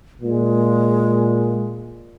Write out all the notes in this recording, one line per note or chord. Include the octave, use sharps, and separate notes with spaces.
A#2 G#3